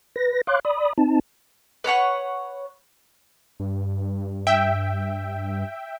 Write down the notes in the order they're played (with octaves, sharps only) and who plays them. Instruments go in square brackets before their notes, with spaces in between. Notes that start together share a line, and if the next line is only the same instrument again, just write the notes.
[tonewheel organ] B4 A#6
C#5 F5 C6 D6 F#6
D5 B5 D#6
C4 D#4 A5
[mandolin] B4 C#5 F#5 C#6
[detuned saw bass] G2
[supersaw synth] E5 G5